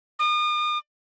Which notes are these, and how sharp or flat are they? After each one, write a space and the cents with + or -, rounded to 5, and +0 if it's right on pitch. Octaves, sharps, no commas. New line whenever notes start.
D#6 -40